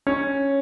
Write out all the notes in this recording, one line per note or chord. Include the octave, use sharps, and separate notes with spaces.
C#4